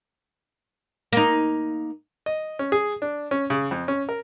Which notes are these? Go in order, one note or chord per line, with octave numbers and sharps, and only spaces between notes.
A#3 D#4
D#5
C#4
G#4
D4
C#4
C#3
F2
C#4
A#4